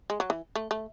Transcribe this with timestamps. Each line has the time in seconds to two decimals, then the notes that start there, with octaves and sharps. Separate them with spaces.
0.10 G#3
0.20 F#3
0.30 E3
0.55 A3
0.71 A3